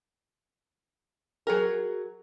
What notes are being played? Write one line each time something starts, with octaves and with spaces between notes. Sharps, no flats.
F#3 G#4 A#4